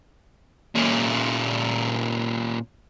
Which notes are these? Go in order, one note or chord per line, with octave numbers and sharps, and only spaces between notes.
A#2 C#4